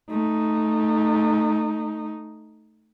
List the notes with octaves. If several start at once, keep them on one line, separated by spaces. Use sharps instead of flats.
A3 D#4